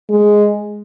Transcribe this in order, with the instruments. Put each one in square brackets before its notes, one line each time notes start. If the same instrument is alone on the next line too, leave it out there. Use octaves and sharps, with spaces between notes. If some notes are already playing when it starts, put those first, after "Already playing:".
[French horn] G#3